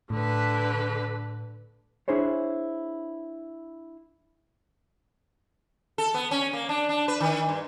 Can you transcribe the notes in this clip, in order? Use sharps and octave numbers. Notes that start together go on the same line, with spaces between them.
A2 D3 B4
D4 E4 G#4 C5 C#5
A4
B3
C#4
A#3
D4
D4
B4
D#3
G2